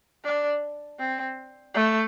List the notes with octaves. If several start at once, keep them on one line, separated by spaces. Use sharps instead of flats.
D4
C4
A3